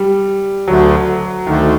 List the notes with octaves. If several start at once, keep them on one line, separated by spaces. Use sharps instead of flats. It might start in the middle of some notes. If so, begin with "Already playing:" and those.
Already playing: G3
D2 D3 F#3 A3
D2 D3 D#3 A3